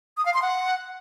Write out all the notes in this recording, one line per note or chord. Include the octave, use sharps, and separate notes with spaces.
D#6
F5
C6
F#5